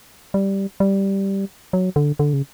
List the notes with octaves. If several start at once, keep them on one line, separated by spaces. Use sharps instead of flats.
G3
G3
F#3
D3
D3
C#3